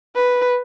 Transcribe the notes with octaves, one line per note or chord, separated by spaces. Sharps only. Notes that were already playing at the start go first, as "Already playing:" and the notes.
B4